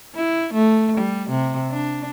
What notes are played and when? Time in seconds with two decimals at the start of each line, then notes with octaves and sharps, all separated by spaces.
0.15 E4
0.54 A3
0.97 G3
1.30 C3
1.71 D4